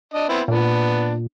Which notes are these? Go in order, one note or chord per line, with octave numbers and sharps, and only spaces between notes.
D4 D#5
B3 C4 E4
A#2 B3 D4